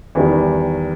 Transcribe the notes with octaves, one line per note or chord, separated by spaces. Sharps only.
E2 D#3 G3